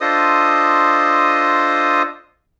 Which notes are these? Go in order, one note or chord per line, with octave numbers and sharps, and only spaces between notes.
D4 F4 A4 C5 D#5 D#6